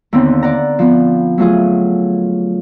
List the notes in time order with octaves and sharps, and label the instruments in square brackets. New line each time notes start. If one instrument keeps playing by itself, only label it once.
[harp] D#2 D3 B3 C4
D5 F#5 A#5
F3 B3
F#3 A3 F4 G#4